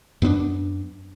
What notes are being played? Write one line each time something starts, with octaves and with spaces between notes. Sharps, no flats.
F#2 B3 C4 D4